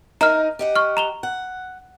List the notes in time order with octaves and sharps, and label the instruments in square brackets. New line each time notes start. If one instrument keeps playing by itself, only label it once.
[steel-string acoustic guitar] D#4 A#4 D#5 [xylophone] A#5 F6
[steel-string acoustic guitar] G4 D#5 F#5
[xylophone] C#6 F6
A#5 F7 G7
[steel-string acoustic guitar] F#5